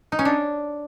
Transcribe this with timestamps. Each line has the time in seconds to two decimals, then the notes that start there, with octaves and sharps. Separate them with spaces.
0.12 D#4
0.19 C#4
0.25 D4